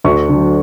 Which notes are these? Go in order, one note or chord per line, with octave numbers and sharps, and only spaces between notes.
D2 C#6
D3 F#3